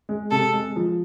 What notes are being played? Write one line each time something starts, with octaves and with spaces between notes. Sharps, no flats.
G#3
C3 A4
G#3
F3